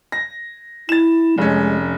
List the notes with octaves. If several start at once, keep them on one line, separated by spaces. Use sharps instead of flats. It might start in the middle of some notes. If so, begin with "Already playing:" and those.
A#6
E4 A6 E7
F1 G#3 C#4